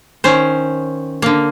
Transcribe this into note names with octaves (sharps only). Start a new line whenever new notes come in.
D#3 C#4 C5
D3 A#3